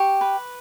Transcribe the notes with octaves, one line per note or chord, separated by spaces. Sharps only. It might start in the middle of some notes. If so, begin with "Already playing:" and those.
Already playing: G4 C#6
B4